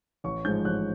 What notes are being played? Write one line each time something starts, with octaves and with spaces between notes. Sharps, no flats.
A1 C#6
G#2 F3 G#3 G6
A1 F#6